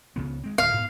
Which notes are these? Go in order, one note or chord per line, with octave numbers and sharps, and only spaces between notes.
C#2 C#3 B3
G#3 C4
D1 F5
G#2 B3